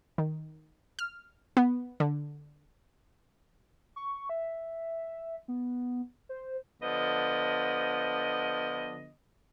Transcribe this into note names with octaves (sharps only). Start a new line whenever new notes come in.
D#3
F6
B3
D3
C#6
E5
B3
C5
D3 F3 B3 D#5